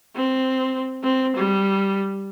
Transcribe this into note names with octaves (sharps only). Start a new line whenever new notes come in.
C4
C4
G3